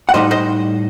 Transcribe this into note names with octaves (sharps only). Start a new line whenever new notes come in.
F#5
A2 G3 C4 D#4 C5 D#5
C5 D#5